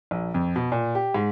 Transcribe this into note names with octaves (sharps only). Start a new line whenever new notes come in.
A#1
F2
B2
A#2
G4
G#2